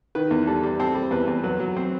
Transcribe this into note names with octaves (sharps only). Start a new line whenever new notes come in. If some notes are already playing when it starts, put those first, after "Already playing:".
D#3 B4
E2
G3 A4
G3
C4 A4
G3
E2 B4
E2
F#3 B4
F#3
C4